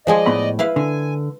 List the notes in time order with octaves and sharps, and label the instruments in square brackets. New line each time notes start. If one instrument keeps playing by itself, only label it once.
[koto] F3 G#3 G#4 [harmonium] D5 D#5
[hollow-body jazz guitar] A2 B3 B5
[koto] E4 B4 F5
[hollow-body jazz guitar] D3 [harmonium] G#5